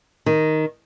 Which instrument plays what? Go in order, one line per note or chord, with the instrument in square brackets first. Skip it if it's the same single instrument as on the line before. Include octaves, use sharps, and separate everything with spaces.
[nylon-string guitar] D#3